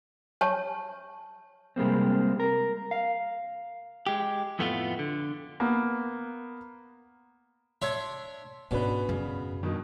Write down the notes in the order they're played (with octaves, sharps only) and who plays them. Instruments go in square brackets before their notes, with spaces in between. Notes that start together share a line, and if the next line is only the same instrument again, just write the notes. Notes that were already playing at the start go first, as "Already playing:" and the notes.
[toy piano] C#5 A5 C#6
[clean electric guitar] C3 G3 G#3 A#3 C4
A#4
F5
G#3 G4
F2 A2 A3 B3 E4 F4
D3
[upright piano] A#3 B3
[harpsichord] D4 C#5 E5 [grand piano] C6 G#6
[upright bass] G#2 G#3 [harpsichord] B2 [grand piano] C#4 D4 B4
[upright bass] F#2 [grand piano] C#3
[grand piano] G2 B2 D#3